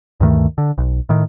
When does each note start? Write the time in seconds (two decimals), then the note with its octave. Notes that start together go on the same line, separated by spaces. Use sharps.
0.20 D2 G2 D#3 A3
0.58 D3
0.78 B1
1.09 A2 D#3